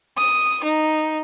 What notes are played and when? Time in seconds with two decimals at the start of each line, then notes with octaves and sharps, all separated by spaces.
0.17 D#6
0.63 D#4